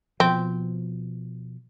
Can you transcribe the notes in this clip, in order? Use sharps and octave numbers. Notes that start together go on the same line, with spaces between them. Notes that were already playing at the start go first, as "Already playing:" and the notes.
B2 F3 C4